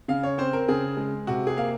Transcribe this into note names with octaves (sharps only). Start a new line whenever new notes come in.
C#3 F5
C#5
C4 C5
A#4
C#3 G#4
G#3
C3 F#4
G#4
A#3 F5